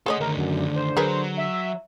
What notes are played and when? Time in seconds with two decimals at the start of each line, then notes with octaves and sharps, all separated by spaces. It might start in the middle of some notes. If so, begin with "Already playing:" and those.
0.06 A3 G#4 A4 C#5 D#5 F#5
0.20 D3 D#3 A3 A#4
0.37 F#2
0.75 C5
0.97 F#3 G#4 A#4 B4
1.37 E5